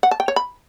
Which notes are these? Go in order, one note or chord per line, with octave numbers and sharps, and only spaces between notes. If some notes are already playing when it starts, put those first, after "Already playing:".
F#5
A5
G5
C#5
B5